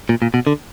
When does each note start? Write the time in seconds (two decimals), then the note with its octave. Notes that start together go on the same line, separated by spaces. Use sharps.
0.09 A#2
0.22 A#2
0.34 B2
0.47 D3